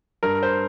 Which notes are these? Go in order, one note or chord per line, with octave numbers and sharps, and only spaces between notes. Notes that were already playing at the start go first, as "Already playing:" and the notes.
G2 A#4
C5